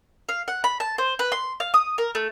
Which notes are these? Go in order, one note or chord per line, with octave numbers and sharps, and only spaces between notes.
F5
F#5
B5
A5
C5
B4
C6
F5
D#6
A#4
A3